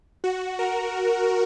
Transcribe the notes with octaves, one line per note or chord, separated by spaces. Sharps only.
F#4
A#4